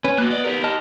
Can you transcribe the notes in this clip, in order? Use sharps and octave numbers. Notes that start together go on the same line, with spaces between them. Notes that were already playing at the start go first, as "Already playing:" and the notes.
C#4 B4
A#3 B3 F#4 F#6
D5 D#5
G4 A#4
D#5 A5 F6